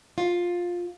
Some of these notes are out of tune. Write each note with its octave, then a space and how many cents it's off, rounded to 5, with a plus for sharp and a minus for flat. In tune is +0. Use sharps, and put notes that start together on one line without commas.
F4 +10